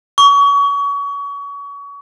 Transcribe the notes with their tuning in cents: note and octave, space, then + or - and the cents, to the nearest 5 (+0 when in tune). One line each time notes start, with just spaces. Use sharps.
C#6 +30